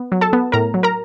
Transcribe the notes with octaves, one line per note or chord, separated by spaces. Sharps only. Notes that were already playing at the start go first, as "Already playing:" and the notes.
Already playing: B3
F#3
A4 A5
B3
A2 A#4 A#5
F#3
A#4 A#5